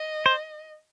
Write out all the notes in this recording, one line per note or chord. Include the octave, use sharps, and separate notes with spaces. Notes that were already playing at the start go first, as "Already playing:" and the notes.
Already playing: D#5
C5